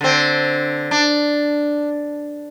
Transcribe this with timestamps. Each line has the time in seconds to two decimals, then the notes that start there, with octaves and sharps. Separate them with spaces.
0.01 D3 C4
0.91 D4